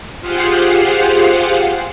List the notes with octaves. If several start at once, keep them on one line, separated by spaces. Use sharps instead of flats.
F4 G4 G#4 C5 F5 F#5